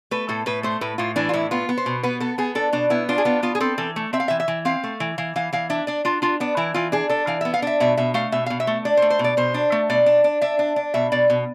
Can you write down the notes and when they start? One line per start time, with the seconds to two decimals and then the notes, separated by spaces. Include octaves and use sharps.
0.11 A3 B4
0.29 A2 A4
0.46 A2 B4
0.63 A3 C5
0.81 A2 B4
0.98 A2 F4
1.16 E3 D4
1.29 F4
1.33 A2 E4
1.51 B3 F4
1.69 B3
1.77 C5
1.86 B2
2.03 B3 B4
2.20 B3 A4
2.38 B3 G#4
2.55 D4 A4
2.73 B2 D4
2.90 B3 E4
3.09 D4 F4
3.18 G#4
3.25 B3 F4
3.43 B3 F4
3.55 G#4
3.60 C4 A4
3.78 E3 A4
3.96 A3
4.13 C4 E5
4.20 F5
4.28 E3 E5
4.40 E5
4.48 E3
4.65 C4 F5
4.83 A3
5.00 E3
5.18 E3 F5
5.36 E3 F5
5.53 E3 F5
5.70 D4 E5
5.87 D4 D5
6.05 D4 F4
6.22 D4 F4
6.40 B3 D4
6.57 E3 E4
6.74 E3 F4
6.92 D4 G#4
7.09 D4 A4
7.27 E3 F5
7.41 E5
7.45 B3
7.54 F5
7.62 D4 E5
7.80 B2 E5
7.97 B2 E5
8.14 A3 F5
8.32 B2 E5
8.46 B2 F5
8.60 E5
8.67 A3
8.85 D4 D5
8.97 C5
9.02 A3
9.10 C5
9.19 B2
9.24 D5
9.37 B2 C5
9.54 D4
9.72 A3
9.90 B2 D5
10.06 D4
10.24 D4
10.41 D4 E5
10.59 D4
10.76 D4
10.94 B2 E5
11.12 B2 D5
11.30 B2